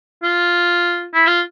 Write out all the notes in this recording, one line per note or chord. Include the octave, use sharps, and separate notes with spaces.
F4
E4
F4